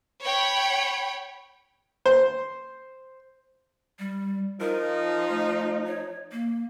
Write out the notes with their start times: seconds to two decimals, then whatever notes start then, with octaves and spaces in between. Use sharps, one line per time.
0.24 C#5 G5 B5
2.06 C5
3.99 G3
4.60 F3 D#4 A#4
5.29 A3
5.86 C#5
6.32 A#3